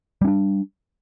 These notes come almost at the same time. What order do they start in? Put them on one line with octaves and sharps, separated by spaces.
G3 C#4 D4